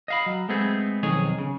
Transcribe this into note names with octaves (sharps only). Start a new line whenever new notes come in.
D#5 F5 B5
F#3
G#3 A3 B3 C4 G#4
B1 F2 D#3 G#4 C#5
C#3